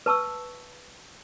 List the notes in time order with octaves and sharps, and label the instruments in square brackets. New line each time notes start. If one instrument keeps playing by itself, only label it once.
[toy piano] B4 A5 C#6 E6